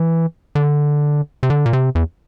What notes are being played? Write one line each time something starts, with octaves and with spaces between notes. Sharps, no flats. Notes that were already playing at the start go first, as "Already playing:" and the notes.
Already playing: E3
D3
C3
D3
A#2
C3
E2